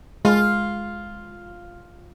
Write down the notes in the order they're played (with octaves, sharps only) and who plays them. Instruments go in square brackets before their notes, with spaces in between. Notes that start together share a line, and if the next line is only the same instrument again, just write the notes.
[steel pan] G#3 [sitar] F4